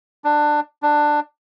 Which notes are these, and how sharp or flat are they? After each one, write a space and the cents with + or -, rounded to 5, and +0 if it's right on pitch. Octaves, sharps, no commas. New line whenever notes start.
D4 +15
D4 +15